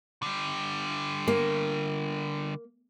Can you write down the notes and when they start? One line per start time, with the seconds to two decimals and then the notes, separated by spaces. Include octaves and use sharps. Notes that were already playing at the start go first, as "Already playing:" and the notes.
0.23 D3 G3
1.28 A#3